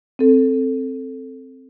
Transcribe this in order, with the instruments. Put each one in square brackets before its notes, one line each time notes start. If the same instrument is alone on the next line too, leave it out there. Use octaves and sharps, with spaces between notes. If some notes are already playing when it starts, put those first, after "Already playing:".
[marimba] C4 A4